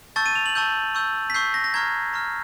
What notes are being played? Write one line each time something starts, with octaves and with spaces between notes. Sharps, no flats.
A5 C#6 E6 G6 A6
D#7
F7
F#7
A5 C#6 E6 G6
C#6 E6 G6
B6
C#6 E6 G6 C7
A#6
A#6
A#5 C#6 F6 G#6
A#5 C#6 F6